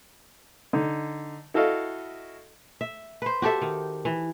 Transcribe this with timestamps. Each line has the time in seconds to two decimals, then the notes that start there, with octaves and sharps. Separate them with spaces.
0.73 D3 D#4
1.54 E4 F#4 A4 D#5 F5
2.81 E5
3.22 B4 C5
3.42 F#4 G4 A4 E5
3.62 D#3
4.05 E3